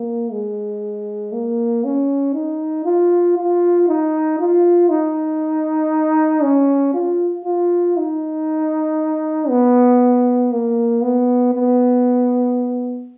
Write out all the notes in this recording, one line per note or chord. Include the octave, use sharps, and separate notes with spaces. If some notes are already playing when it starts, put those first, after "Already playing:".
Already playing: A#3
G#3
A#3
C#4
D#4
F4
F4
D#4
F4
D#4
C#4
F4
F4
D#4
B3
A#3
B3
B3